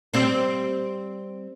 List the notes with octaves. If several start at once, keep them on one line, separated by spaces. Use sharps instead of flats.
G3 C4 C5